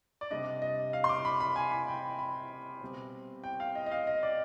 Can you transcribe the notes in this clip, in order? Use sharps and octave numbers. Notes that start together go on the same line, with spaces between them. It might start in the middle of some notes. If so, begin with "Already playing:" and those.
D5
C3 G3 D4 D#5
D#5
F5
C6
D6
B5
B5
G#5
B5
G5
B5
B2 G3 C4
G5
F5
D#5
D#5
F5
D#5
D5